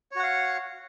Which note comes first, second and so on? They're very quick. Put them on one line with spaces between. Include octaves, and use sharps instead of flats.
C#5 F#4 F#5 F5